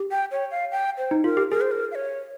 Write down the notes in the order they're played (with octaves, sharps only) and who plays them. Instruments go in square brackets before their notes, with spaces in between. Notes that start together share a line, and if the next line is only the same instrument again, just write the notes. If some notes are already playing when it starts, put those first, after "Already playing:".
Already playing: [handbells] G4
[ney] G5
C#5
F5
G5
C5
[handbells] D#4
[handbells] F4 [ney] A#4
[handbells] G4
[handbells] G#4 [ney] A#4
[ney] C5
A#4
F5
C#5